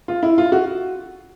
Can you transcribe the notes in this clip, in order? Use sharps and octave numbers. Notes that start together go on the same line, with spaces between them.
F4
E4
F4
F#4